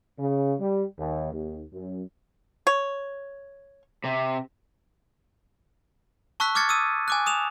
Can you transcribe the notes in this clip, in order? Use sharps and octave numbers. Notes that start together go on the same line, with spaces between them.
C#3
G3
D#2
D#2
F#2
C#5
C3
A5 C#6 E6 F#6 B6
D6 F6 G#6 A6 C#7
D#6 E6 D#7
G#5 D6 F#6
D#6 E7 F7